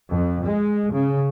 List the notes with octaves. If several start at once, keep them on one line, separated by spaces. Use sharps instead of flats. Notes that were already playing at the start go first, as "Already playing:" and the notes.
F2
G#3
C#3